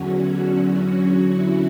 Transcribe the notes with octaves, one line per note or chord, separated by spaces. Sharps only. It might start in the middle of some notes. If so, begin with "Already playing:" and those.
Already playing: E2 D3 F#3 C#4 F#4
F#4
E4